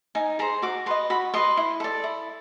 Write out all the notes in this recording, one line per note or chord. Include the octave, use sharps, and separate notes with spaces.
D#4 G#5
G#4 C5 A#5
F#4 D6
B4 D#5 C6
F#4 B5
B4 D#5 C6
E4
A4 D5
E4